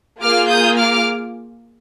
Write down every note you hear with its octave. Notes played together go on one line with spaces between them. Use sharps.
A#3 F4 G#4 D6 F6
D#6 G6
D6 F6